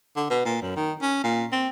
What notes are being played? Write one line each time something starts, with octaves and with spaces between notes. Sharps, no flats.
D3
B2
A#2
F#2
D#3
C#4
A#2
C4